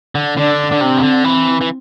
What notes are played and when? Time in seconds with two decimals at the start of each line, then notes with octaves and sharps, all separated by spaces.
0.15 D3
0.37 D3 D4
0.72 D3
0.81 C3 C4
0.97 E3
1.02 D3
1.24 E3
1.61 E3